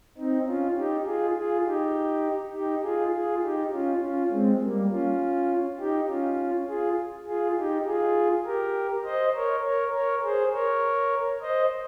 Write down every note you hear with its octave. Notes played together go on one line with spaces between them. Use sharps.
C4 D#4
C#4 F4
D#4 G4
F4 G#4
F4 G#4
D#4 G4
D#4 G4
F4 G#4
F4 G#4
D#4 G4
C#4 F4
C#4 F4
G#3 C4
G3 A#3
C#4 F4
D#4 G4
C#4 F4
F4 G#4
F4 G#4
D#4 G4
F4 G#4
G4 A#4
C5 D#5
A#4 C#5
A#4 C#5
A#4 C#5
G#4 C5
A#4 C#5
C5 D#5